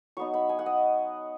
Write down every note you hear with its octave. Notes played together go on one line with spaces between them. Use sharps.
F#3 B3 D#4 C#6
B5
G#5
F#5
D#5